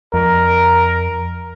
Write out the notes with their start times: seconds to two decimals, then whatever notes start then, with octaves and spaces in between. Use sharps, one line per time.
0.14 F2 A#4